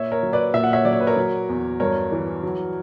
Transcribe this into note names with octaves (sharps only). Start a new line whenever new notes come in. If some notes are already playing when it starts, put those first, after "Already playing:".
Already playing: A#2 C#5 E5
A#4 C#5
F#3
B4 D5
A#2 E5
F#5
C#5 E5
F#3 D5
C#5
B4
A#4 C#5
F#3
E2
G2 A#4 C#5
E3
F#3